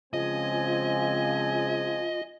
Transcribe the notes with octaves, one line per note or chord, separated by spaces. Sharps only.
C#3 F3 G#3 C4 F4 D#5 G#5